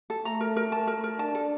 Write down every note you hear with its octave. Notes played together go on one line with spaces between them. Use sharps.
A4
A3 A#5
A#4
A#4
A5
A#4
A#4
D4 A5
A4